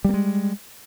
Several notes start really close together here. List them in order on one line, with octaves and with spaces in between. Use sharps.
G3 A#3 G#3